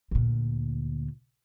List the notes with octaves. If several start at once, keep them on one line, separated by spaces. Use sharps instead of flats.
D2 A#2